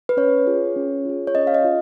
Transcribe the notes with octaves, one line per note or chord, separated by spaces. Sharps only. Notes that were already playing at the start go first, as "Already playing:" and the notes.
B4
C#4 C#5
F4 G#4
C#4
F4 G#4
C#5
C#4 D#5
F5
D#5
F4